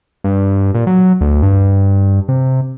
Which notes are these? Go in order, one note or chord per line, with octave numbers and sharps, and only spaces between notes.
G2
A#2
F#3
D2
G2
C3